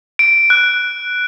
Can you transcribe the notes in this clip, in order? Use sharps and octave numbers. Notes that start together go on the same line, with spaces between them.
D7
F#6